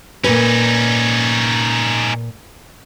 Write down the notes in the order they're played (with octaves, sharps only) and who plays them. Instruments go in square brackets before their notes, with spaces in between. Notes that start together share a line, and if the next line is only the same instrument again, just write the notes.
[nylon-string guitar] A#2 B4 [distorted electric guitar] C#4 D#4